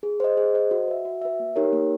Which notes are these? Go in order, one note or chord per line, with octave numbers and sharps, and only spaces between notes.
G#4
C5 D#5
G#4
C5 D#5
F#4
B4 E5
F#4
B4 E5
A#3
D#4 G4 A#4 C#5
A#3